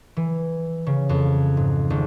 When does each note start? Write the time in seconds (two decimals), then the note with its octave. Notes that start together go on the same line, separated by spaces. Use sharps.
0.17 E3
0.87 C#3
1.09 F2
1.57 G#2
1.90 G#1